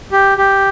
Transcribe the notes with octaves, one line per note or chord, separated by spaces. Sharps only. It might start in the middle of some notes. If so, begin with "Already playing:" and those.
G4
G4